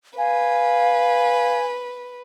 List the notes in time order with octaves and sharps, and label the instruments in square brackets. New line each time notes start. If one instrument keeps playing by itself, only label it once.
[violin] B4 [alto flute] F5 [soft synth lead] G#5